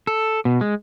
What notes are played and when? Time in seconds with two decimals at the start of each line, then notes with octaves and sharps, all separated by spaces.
0.07 A4
0.45 B2
0.61 G#3